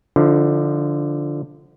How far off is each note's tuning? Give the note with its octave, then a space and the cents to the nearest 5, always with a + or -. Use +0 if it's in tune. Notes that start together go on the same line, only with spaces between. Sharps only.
D3 +0 F3 -5 D#4 +40